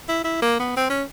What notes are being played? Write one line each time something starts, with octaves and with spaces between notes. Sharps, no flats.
E4
E4
A#3
B3
C4
C#4